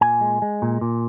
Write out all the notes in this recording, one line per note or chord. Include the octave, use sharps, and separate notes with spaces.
A#2 G#5
G#3
G#3
A#2
A#2